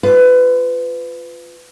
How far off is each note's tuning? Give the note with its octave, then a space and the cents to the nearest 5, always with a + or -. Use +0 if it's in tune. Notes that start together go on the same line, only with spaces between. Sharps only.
F4 +0 B4 +25